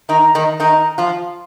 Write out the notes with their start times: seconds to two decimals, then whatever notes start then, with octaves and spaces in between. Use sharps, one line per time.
0.09 D#3 D#4 A#5
0.35 D#3 D#4
0.60 D#3 D#4 A#5
0.98 F3 F4